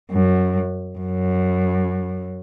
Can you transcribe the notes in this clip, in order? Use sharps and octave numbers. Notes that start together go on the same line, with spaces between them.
F#2
F#2